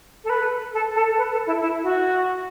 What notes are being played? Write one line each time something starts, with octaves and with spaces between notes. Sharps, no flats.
A4
B4
A4
A4
B4
A4
E4
E4
F#4